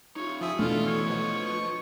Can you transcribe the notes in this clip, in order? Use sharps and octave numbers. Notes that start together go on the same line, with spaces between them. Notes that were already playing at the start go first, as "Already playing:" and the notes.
D#4 F4 C#5
F3 G#4 E5
B2 E3 A3 D4 F4 A4
C#5
F3 B4 D#5
C#6